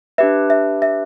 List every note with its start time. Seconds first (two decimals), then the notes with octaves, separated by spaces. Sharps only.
0.18 D4 G4 B4 E5
0.50 E5
0.82 E5